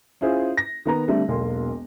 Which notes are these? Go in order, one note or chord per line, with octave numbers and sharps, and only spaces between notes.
C#4 E4 F4 G#4 C5
A#6
D#3 B3 A#5
D3 G3 A3 C4
E1 B1 A#3 C6